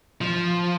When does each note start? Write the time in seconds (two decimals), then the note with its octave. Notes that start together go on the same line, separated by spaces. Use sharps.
0.21 F3